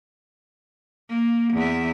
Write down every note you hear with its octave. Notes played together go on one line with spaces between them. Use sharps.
A#3
E2 E5